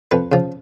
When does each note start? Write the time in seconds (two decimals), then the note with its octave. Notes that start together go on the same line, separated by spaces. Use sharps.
0.11 F2 B4
0.32 C#3 F3